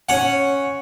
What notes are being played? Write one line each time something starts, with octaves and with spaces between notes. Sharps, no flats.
C#4 F#5